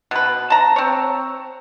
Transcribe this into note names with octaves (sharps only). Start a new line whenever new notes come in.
B2 B4
A5 A#5
C4 C#5